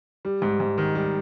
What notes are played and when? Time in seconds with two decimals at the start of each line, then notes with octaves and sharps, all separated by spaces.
0.25 G3
0.42 G#2
0.60 G#2
0.78 D#3
0.95 G3